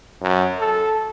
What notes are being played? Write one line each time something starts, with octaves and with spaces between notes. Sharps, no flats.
F#2
A4